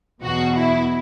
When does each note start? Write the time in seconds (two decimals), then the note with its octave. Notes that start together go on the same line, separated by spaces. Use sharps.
0.23 E2 B2 F#3 F#4
0.56 E4